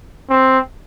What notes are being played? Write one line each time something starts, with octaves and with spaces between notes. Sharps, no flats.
C4